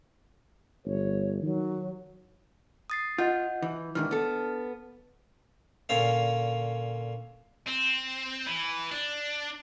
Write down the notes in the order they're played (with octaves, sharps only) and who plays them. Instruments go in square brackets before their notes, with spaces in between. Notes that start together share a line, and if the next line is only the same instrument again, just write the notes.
[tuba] G1 [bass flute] C#5
[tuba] D#3 [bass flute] F#3
[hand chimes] D#6 A6 C7
[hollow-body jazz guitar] F4 [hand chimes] D#5 F#5 G6
[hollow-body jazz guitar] E3
[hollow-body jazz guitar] G#2 D#3 E3 [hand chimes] D4 F6
[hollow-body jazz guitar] B3 A4
[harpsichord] A#2 D3 C#4 F5
[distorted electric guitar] C4
E3
D4